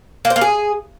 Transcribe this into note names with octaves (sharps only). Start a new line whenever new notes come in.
A#3
C5
A#3
G#4